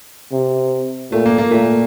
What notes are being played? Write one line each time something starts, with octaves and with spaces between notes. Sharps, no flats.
C3
A#2 A3
A#3
A#3
A#2 A3